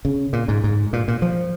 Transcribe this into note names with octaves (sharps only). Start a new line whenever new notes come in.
C#3
A#2
G#2
G#2
A#2
A#2
F3